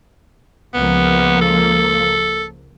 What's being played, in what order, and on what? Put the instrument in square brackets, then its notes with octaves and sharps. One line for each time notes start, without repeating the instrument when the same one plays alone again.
[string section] C#2 F3 A#3 [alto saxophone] B3
[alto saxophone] A4